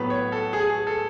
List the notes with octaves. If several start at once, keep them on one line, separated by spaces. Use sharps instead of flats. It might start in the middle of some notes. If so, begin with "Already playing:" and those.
Already playing: A2 F#3 B3 B4
C#5
A4
G#4
G#4
A4